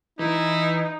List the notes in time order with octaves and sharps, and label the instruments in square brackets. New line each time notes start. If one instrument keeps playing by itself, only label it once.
[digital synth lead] E3 [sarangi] D#4 [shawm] E4